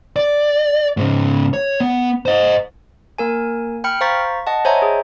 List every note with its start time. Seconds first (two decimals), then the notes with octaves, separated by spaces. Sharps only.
0.16 D5
0.97 G#2 C#3
1.53 C#5
1.80 B3
2.26 C5 D#5
3.18 A#3 A#4 G#5
3.84 G5 B5 F6 C#7
4.01 C5 F5 A#5 C#6 A6 B6
4.47 D#5 F#5 A5
4.65 C5 C#5 D#5 E5 G#5 A#5
4.82 G#4